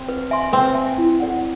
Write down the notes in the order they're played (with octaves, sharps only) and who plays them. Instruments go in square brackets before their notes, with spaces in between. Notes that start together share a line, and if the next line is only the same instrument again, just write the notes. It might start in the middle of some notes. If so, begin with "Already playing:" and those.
Already playing: [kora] C4
[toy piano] B4
E5 G#5 C6
[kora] C4 [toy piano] B4
[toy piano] E5 G#5 C6
E4
A4 D5 F#5